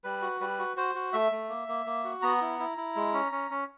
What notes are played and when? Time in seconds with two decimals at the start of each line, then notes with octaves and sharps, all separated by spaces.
0.04 G3 B4
0.22 F#4
0.40 G3 B4
0.59 F#4
0.77 F#4 C5
0.95 F#4
1.13 A3 E5
1.32 A3
1.49 A#3
1.68 A#3
1.86 A#3
2.04 F#4
2.22 B3 A#5
2.41 E4
2.60 E4
2.78 E4
2.96 G#3
3.14 C#4
3.32 C#4
3.51 C#4